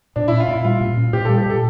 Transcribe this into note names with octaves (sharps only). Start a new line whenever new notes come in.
A#2 D4
C#4 E4
F4
A#2 E4
G3 F4
A#2
C#4
A#2 G4
G3 A4
G4
A#2 A4